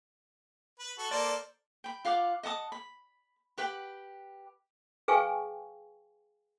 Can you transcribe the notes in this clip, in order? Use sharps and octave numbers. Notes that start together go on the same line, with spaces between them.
B4
F#4 A4
A#3 A4 C5 D5
G5 B5
F4 F5 F#5 D6
D#5 F#5 A5 D#6
B5
G4 B4 F#5 G5
G#4 B4 F5 G5 G#5 C#6